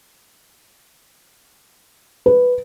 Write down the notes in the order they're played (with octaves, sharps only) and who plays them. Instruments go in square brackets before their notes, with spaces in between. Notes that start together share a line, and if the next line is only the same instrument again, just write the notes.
[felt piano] B4